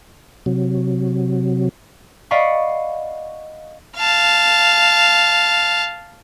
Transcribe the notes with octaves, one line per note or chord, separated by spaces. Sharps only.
C3 F#3
D5 D#5 F5 F#5 B5 C#6
F5 A5